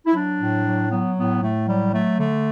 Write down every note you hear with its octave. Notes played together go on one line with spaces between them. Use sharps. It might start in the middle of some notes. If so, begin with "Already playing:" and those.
E4
F#3 D4
A2
F#3
F#3 B3
A2 B3
A2 A3
F#3 G3
F#3 A3
D3 A3